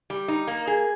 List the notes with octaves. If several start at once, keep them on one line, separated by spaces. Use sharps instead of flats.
G3
D#4
A#3
G#4